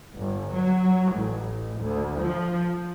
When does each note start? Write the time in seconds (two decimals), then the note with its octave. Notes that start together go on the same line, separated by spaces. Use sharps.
0.15 G1
0.53 F#3
1.14 A1
1.81 D2
2.19 F3